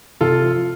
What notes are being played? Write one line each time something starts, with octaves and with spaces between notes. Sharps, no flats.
C3 F4 A4
F3